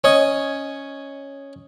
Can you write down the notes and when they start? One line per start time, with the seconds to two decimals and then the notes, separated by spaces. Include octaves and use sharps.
0.04 C#4 C#5 D#5